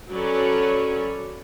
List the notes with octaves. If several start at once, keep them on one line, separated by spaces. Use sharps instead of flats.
F#3 C#4 A4 B4 C#5 D5